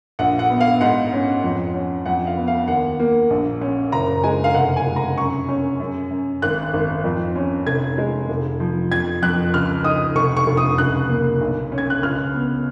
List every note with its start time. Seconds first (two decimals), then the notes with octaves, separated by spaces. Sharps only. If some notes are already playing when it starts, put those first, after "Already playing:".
0.19 A#1 F#5
0.39 F#5
0.50 B3
0.60 F5
0.81 G#2 F#5
1.12 C#4
1.44 F2
1.74 C#4
2.06 F2 F#5
2.27 F5
2.37 B3
2.48 F5
2.68 D#2 F#5
3.00 A#3
3.30 A#1
3.61 C#4
3.92 F#1 A#5
4.24 G#3 G#5
4.44 F5
4.54 F1 F#5
4.76 G#5
4.86 G#3
4.96 A#5
5.18 F#2 C#6
5.49 C#4
5.80 F#2
6.10 F#2
6.42 G#1 F#6
6.73 G#1
7.04 F2
7.36 C#4
7.67 F1 G#6
7.98 G#3
8.29 F1
8.60 F3
8.91 F2 G#6
9.22 F2 F#6
9.54 C#2 F6
9.84 D#4 D#6
10.16 F1 C#6
10.37 C#6
10.47 F1
10.57 D#6
10.78 C#2 F#6
11.09 A#3
11.41 B1
11.72 C#4
11.78 G#6
11.90 F#6
12.02 C#2 F6
12.34 B3